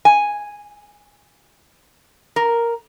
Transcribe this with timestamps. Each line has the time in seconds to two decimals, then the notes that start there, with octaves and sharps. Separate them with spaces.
0.05 G#5
2.36 A#4